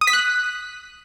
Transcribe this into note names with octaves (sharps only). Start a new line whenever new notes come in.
D#6
B6
F#6